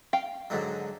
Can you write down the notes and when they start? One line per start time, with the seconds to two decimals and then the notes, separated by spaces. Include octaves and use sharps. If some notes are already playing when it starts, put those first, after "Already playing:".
0.13 F5 G5
0.50 G#2 D3 F#3